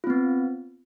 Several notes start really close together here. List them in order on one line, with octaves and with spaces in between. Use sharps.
F4 C4 B3